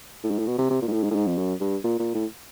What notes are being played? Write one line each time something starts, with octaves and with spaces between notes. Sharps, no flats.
A2
G#2
A2
B2
C3
C3
A#2
G#2
A2
G#2
A2
G#2
F2
F#2
G2
A#2
A#2
A2